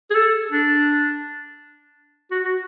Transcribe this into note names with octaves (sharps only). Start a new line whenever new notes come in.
G#4
A4
D4
F#4
F#4